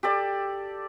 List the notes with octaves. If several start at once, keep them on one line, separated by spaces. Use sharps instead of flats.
G4 A4 D5